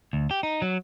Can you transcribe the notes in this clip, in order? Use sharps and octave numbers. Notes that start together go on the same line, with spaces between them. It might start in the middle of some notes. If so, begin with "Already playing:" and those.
D2
G4
D#4
F#3